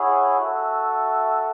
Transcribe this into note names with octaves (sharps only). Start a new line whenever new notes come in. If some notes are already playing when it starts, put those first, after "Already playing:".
Already playing: E4 G#4 C#5 F#5
F#4 A4 E5